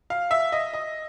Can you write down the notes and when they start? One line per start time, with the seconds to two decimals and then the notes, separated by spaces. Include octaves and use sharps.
0.10 F5
0.31 E5
0.52 D#5
0.73 D#5